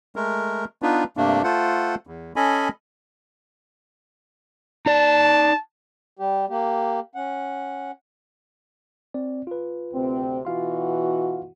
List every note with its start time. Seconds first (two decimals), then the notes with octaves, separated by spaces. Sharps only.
0.16 G#3 A3 A#4
0.82 B3 D4 D#4 F4 B4
1.17 G2 C3 A3 A#3 D4
1.44 A3 F4 A4 C5 F#5
2.07 E2
2.36 C#4 A4 D#5 G#5 B5
4.86 D#4 D5 A5
6.19 G3 G4
6.49 A#3 G4
7.15 C#4 F#5
9.14 C4 D5
9.47 F4 B4
9.93 D2 C3 C4
10.45 B2 E3 F4 F#4 F5 C6